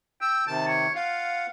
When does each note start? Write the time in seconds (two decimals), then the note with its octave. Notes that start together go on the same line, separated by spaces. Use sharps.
0.21 G5 E6
0.47 C3 D#3 A5
0.67 C#5
0.95 F4 F5 F#5